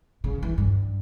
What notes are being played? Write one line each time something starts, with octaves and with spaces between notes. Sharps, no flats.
C#3
E3
G2